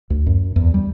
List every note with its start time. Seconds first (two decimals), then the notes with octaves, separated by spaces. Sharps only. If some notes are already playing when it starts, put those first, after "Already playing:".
0.10 D2
0.27 F#2
0.56 E2
0.74 G3